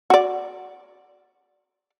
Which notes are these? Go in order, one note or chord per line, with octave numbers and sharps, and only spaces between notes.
F#4 D5